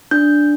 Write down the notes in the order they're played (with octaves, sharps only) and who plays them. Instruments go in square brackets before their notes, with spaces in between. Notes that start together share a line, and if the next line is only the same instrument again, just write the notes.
[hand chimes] D4 G6